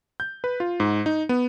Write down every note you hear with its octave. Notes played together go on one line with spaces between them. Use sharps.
G6
B4
F4
G#2
D#4
B3